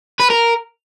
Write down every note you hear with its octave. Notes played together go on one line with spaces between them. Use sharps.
B4
A#4